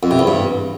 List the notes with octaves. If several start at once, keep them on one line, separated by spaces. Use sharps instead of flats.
F2
C3
E2
G2